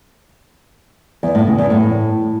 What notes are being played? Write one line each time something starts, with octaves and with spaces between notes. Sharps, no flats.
E2
A2
C#3
E2
A2